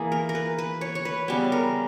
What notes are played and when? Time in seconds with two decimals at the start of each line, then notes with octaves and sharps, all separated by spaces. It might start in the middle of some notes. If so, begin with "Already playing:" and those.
Already playing: E3 A#3 G#4
0.12 A#4
0.29 A#4
0.35 B4
0.58 B4
0.81 C#5
0.95 C#5
1.05 B4
1.28 C#3 G3 B3
1.52 A#4